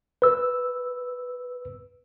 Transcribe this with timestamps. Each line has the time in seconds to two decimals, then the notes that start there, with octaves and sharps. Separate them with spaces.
0.22 B4 E6